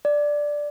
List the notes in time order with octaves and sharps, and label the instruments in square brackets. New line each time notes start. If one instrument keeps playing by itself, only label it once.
[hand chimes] D5